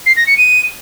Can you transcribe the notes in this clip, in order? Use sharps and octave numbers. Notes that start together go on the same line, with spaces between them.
C7
A#6
C#7
D#7